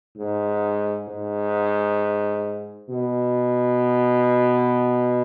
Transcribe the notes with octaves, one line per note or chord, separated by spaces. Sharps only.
G#2
G#2
B2